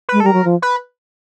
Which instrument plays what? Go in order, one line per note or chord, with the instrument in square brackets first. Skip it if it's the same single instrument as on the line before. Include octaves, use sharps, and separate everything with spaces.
[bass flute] G#3 [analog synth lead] B4
[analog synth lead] A4
[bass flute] G3 [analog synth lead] A#4
[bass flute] F#3
F3
[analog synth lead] B4